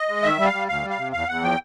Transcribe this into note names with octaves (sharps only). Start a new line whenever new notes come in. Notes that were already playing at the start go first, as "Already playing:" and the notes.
Already playing: D#5
G#3
D#3 E5
G3
F5
G3
D2 F5
G3
F5
C3
E2 F5
E2 F#5
F3 G5